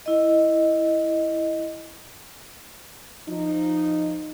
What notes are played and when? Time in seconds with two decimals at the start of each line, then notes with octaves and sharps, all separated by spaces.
0.06 E4 D#5
3.28 F3 D#4